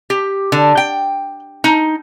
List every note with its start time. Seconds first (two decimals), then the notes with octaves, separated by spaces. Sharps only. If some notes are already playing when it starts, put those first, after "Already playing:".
0.10 G4
0.52 D3
0.77 G5
1.64 D#4